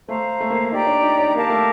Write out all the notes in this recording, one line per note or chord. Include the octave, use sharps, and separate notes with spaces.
A3 C5 F5 A#5
A3
A#3
D#4 G4 D5 G5 A#5
D4
D#4
D4
A#3 G4 A#4 F5 A5
A3